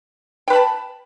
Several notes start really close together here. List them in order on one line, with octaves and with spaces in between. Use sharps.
G5 B4 B5 A5